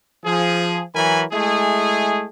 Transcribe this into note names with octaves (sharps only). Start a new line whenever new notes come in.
F3 G#4
E3 F#3 A#4 G#5 B5
G#3 A3 E4 G#4